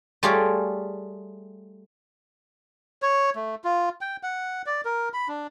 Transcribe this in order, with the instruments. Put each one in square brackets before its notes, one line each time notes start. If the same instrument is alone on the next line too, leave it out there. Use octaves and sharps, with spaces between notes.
[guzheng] G3 A3 F4 G#4 C#5 D5
[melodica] C#5
A3
F4
G5
F#5
D5
A#4
B5
D4